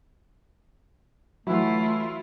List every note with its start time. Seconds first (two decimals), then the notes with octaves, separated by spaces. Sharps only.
1.47 E3 F#3 A3 E4 F4